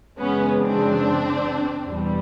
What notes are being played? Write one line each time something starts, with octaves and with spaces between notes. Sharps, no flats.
F#2 C#3 E3 G#3 B3 C#4
C4 D4
E2 B2 G3